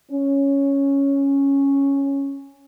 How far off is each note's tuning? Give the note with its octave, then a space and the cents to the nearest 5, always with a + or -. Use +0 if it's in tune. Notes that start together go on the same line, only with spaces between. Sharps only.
C#4 +0